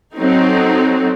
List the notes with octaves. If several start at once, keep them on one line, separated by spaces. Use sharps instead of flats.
F#3 C4 D#4 A4